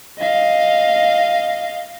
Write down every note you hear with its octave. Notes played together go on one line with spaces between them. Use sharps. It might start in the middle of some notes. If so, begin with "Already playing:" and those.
D#5 F5